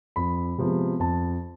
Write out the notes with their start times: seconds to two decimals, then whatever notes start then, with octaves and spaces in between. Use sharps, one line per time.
0.16 F2 B5
0.58 C3 F3 G#3 B3
1.00 F2 A5